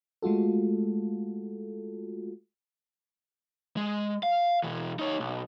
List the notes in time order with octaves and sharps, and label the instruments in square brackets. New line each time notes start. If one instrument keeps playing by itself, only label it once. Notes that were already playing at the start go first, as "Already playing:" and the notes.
[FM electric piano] G#3 A3 F4 F#4 A4
[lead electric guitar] G#3
F5
B2 E3
D#4 C#5
B1